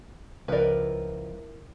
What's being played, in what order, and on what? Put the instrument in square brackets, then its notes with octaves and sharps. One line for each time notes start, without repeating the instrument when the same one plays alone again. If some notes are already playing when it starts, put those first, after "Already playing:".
[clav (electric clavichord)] C#2 F3 [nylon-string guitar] E4 A#4 [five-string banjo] B4 D5